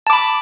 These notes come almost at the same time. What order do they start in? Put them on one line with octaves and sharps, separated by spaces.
A5 D6 B5